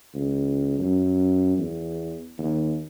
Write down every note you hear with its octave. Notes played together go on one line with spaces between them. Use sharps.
C#2
F#2
E2
D#2